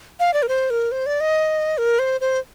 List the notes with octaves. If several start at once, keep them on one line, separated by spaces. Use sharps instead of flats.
F5
D5
A#4
C5
A#4
C5
D5
D#5
A#4
C5
C5